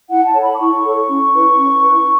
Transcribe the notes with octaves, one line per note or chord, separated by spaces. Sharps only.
E4 F#5
A5
A4 C#5
B5
D6
E4 C#6
A4 C#5
C#4
E4 B4
C#4
E4 B4